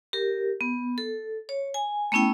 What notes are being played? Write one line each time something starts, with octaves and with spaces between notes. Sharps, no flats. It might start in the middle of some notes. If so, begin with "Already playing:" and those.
G4 A#4
B3
A4
C#5
G#5
A3 B3 C#4 E4 G5